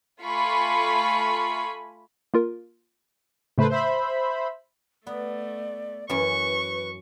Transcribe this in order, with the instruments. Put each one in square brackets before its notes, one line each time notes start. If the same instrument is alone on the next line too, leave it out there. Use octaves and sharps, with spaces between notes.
[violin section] A3 F4 G#5 B5 C#6
[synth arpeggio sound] A#3 F4 A#4
[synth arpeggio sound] A2 C#3 A3 [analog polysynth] A4 B4 C5
[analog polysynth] C5 E5 B5
[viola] A3 [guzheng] B3 [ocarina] D5
[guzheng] F#2 E3 [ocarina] B4 [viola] C#6